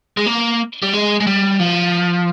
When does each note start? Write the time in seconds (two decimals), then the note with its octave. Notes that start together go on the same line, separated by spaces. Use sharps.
0.17 G#3
0.26 A#3
0.83 G3
0.93 G#3
1.20 G#3
1.27 G3
1.60 F3